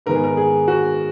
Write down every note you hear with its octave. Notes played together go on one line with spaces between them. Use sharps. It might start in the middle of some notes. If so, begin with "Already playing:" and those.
G#2 D#3 G#3 B3 A#4
G#4
A#4
G#4
F#4